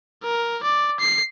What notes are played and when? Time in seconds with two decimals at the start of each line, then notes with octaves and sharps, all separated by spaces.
0.23 A#4
0.63 D5
1.00 C7